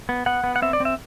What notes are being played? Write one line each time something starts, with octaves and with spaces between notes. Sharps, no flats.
B3
B3 F#5
B3
F#5
C4 E5
D5
C4
E5